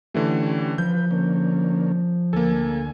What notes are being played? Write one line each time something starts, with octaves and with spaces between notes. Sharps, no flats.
D3 E3 A3 C#4 G4
F3 F4 B4 G6
D3 A#3 C#4
D2 A#3 A4 G#5